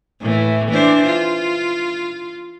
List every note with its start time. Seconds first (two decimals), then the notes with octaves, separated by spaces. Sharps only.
0.21 A2 E3
0.68 E3 D4 C5
1.06 F4